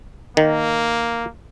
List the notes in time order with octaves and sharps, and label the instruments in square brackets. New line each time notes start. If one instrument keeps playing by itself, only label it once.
[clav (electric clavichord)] D#3 [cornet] A#3